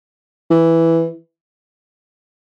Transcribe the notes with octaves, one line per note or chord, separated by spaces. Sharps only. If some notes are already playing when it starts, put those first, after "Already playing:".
E3